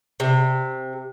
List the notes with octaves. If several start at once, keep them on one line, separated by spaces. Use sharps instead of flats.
C3